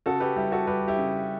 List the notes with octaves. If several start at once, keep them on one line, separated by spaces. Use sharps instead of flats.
C#3 F#4 A4
G4 B4
G3 E4 G4
F#4 A4
G3 G4 B4
E4 G4
C#3